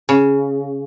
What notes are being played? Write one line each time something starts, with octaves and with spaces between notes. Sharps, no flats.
C#3